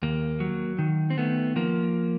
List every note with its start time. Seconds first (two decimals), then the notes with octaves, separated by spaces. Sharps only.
0.03 D#2 A#3
0.40 F#3
0.79 D#3
1.10 C4
1.18 D#3 A3 B3
1.56 F3 A#3